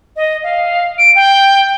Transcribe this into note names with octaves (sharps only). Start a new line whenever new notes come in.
D#5
F5
D7
G5